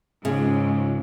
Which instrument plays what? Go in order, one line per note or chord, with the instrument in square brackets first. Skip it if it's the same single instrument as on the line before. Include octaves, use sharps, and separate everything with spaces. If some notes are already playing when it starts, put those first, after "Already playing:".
[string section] C#2 G#2 [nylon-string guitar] C#3